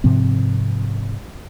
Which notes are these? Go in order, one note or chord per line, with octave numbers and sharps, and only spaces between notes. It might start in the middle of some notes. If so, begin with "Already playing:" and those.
G#2 C3 F3 C4